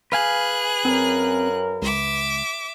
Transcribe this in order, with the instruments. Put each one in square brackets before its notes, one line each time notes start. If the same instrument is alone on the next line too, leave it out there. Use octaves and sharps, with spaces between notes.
[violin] G#4 F#6 [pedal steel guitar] B4 F5 G#5
[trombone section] F#2 C#4 A#4 [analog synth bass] C4
[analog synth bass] C#2 [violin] E5 D6